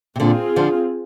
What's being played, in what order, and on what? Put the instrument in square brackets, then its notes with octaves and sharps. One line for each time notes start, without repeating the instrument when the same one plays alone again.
[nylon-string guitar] C3
[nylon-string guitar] A#2 D3 [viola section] C4 F4 G#4
[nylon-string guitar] D3 F3